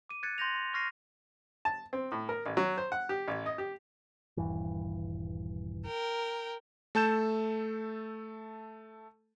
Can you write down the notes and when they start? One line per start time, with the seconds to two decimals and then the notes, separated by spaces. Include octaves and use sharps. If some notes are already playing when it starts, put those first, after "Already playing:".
0.09 D6 D#7
0.23 F#6 G#6 A6 C#7
0.38 C6 G6 A#6 F7
0.55 C6
0.74 C#6 F6 A#6 C7 D#7
1.65 A5
1.93 C4
2.12 A2
2.29 A#4
2.46 A1
2.57 F#3
2.77 C5
2.92 F#5
3.09 G4
3.28 A1
3.46 D#5
3.58 G4
4.37 D#1 G2 E3
5.86 A#4 G5
6.95 A3 A4 A5 G6 E7